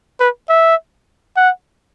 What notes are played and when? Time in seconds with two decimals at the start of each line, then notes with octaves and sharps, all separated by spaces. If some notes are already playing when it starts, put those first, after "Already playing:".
0.20 B4
0.49 E5
1.37 F#5